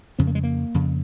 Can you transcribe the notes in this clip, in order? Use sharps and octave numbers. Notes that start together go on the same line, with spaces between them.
F2 C#3 C4
A#3
G#3
A#3
F2 C#3